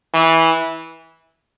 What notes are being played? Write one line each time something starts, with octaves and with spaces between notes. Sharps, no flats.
E3